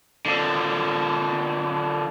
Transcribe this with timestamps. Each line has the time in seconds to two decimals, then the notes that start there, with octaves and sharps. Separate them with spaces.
0.26 D3 F3